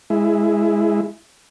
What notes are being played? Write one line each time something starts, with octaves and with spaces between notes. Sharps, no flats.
G#3 E4